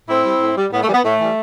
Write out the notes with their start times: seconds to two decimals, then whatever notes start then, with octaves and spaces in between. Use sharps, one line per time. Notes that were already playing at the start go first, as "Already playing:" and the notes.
0.09 A2 C4 E4
0.25 G3
0.41 A2
0.57 G3
0.72 A2 B3
0.83 A3
0.88 E3 G3
0.94 B3
1.04 A2 A3
1.20 E3 G3